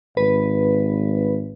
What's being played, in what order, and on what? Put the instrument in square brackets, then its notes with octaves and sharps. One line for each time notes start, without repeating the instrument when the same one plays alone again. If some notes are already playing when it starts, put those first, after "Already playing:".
[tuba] G#1 [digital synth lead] B4